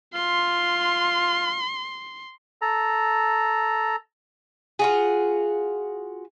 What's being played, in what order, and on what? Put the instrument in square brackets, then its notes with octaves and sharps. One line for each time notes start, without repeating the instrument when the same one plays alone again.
[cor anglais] F4 [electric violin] C6
[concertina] A4 A#5
[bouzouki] F4 F#4 G#4